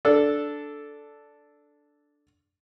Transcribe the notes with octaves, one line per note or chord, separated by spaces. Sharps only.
D4 A4